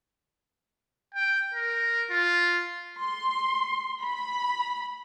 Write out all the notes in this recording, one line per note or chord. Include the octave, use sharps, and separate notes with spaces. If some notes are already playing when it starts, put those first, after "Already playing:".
G5
A#4
F4
C6
B5